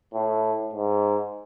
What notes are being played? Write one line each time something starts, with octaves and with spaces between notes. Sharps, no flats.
A2
G#2